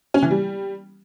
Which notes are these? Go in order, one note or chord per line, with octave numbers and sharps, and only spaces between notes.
C#4
E3
G3